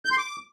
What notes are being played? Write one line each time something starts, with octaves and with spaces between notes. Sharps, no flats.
G6
C6
D6